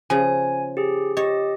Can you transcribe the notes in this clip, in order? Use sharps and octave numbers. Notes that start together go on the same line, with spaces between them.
C#3 F3 G#5
G4 G#4
G4 C#5 D#5